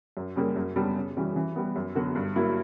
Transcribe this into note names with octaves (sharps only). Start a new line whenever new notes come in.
F#2
C#3 G3 A#3
F#2
C#3 G3 B3 D4
C#3
E3 G3 C#4 F#4
E3
G3 B3
F#2
D3 F#3 B3 F#4
G2
F#3 A#3 E4